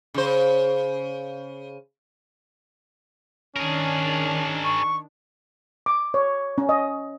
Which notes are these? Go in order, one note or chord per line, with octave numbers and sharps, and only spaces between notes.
C#3 C5
D#3 C#4 D4 G#4 A#4
C#6
D6
C#5
C#4
D#5